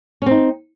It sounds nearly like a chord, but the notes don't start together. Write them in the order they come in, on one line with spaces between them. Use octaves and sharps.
C#4 C4 D#4